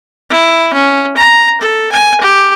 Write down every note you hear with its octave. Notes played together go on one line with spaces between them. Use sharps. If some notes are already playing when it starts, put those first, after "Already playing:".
E4
C#4
A#5
A4
G#5
G4